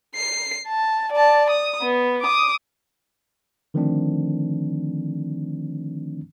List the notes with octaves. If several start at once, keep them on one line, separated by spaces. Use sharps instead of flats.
C7
A5
D5 A5
D#6
B3
D6 D#6
D3 D#3 F3 A3 C4 D4